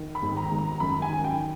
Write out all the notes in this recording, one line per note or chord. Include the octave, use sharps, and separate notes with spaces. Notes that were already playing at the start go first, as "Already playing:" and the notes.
Already playing: D#3
B5
G#1
A#5
G#1
A#5
F#2 B5
G#5
D#3
G5